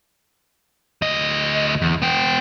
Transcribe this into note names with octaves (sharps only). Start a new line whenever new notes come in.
D2 D#5
E2
B3 G5